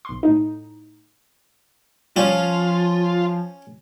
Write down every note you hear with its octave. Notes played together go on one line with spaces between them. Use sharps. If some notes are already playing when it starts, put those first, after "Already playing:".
B1 C6
A2 D#4
F3 G3 C#4 F4